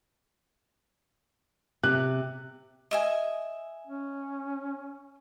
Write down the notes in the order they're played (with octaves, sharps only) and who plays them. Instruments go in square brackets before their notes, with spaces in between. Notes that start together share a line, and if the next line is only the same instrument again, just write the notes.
[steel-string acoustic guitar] C3 [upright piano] F#6
[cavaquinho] D#5 E5 G#5
[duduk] C#4